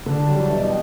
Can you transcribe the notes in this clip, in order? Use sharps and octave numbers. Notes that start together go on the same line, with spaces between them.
D3 D4
F#3 G3
F#3
B2 E3